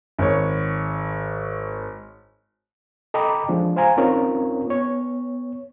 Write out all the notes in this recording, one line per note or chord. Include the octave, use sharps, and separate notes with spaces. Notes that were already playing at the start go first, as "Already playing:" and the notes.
G#1 C#5
A4 D#5 G5 A#5 B5 D6
F3 G#3 D4
C5 F5 G#5 A#5
C4 C#4 D#4 F4 A#4 C#5
B3 C#5